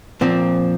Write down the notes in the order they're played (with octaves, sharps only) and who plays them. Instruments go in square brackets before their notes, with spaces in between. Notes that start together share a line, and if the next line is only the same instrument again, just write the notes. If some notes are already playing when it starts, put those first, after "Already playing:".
[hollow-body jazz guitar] A#2 F3 C4